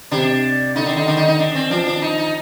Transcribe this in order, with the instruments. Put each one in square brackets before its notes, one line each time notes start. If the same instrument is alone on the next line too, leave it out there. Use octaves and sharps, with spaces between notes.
[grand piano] C3 [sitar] D4
[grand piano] D3 [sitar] D#4
[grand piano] D#3 [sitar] D4
[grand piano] D3 [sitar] D#4
[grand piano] D#3 [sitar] D4
[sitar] D#4
D#4
D4
C4
[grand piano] F3 [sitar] D4
[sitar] D4
D#4
D#4